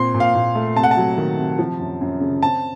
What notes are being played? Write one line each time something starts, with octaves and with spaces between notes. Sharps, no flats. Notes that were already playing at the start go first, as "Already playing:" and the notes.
Already playing: A#2 C4 C6
A#2
F5
A#2
A3
C3 A5
F#5
A5
F#3
D#3
C3
F3
F#2
F#2
C#3
C4 A5